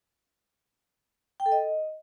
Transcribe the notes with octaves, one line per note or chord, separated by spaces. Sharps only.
G5
A4
D#5